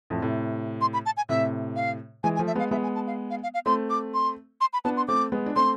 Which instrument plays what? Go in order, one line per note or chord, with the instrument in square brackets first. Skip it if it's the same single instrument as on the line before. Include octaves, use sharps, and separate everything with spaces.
[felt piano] F2 A2
A2 C3
[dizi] C6
B5
A5
G#5
[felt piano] A2 C3 [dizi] E5
[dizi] F5
[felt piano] E3 G#3 [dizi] G#5
[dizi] G#5
[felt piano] F3 A3
[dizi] E5
[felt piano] G#3 B3 [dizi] F5
[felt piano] G#3 B3 [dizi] E5
[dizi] G#5
A5
F5
F5
F5
F5
[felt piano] A3 C4 [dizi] C6
[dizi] D6
C6
C6
B5
[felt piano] B3 D4 [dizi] A5
[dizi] C6
[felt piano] A3 C4 [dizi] D6
[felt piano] G#3 B3
D4
[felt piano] A3 C4 [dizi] C6